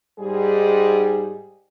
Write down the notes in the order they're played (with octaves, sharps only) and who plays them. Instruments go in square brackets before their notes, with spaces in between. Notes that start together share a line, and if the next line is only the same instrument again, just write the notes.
[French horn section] G#2 G3 G#4